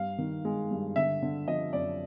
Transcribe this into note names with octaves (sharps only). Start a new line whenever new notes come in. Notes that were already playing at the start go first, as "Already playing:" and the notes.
Already playing: G2 F5
D#3
G#3
G2
D3 E5
D3
F3 D#5
F#2 D5